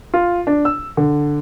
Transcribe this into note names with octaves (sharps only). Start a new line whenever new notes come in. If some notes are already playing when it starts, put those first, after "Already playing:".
F4
D4
E6
D3